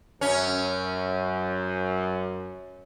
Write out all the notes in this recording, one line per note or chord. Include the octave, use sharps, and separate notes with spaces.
F#2 C#4